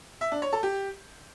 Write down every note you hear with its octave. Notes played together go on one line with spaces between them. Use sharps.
E5
D4
C#5
A4
G4